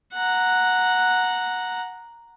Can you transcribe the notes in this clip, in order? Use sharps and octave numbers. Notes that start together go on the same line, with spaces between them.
F#5 A#5